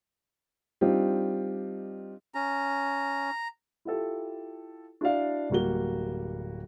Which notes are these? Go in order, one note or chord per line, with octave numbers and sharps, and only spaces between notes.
G3 C4 D4 D#4 F4 G4
C#4 A#5
E4 F4 G4 A4
D4 E4 F#4 D5 F5
D1 G3 A#3 F#4 G7